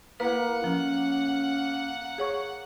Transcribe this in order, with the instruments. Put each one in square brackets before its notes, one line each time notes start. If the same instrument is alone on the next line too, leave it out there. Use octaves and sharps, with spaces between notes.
[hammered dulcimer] A#3 [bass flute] E4 [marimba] B4 [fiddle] F#5
[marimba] F3 [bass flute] C#4
[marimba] G#4 C#5 C#6